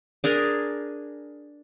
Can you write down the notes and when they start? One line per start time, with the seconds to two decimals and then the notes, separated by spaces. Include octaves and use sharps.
0.24 D4 G#4 A#4